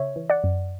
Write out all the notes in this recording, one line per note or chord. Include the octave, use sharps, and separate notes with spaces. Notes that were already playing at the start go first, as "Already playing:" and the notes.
Already playing: C#3 C#5 E5
E3
D5 F#5
F#2